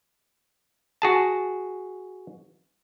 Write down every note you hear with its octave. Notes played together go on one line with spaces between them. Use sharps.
F#4 G#4 A5